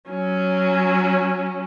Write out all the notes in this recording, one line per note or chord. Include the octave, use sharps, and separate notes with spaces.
F#3 C#4